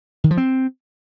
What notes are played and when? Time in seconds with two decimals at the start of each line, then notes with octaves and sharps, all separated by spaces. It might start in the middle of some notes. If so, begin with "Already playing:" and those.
0.24 D#3
0.31 F3
0.37 C4